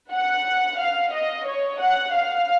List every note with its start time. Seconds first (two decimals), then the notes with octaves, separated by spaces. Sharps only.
0.11 F#5
0.79 F5
1.13 D#5
1.47 C#5
1.81 F#5
2.15 F5